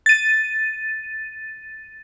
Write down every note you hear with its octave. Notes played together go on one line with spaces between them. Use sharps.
A6 D#7